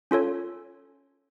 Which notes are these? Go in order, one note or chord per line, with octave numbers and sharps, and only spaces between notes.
C#4 F4 A4 C#5